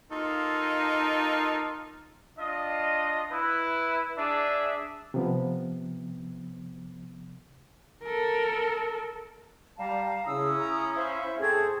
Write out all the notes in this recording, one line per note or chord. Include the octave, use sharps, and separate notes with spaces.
A#3 D#4 F4 A4
D4 F4 D#5
E4 B4
D4 G#4 D5 E5
C3 F3 B3
A4 A#4
G3 F5 A5 A#5
C#3 C#4 E4 D#6 E6
A#5
C5 E5 F5
A2 C4 G#4 A4 C#6 G#6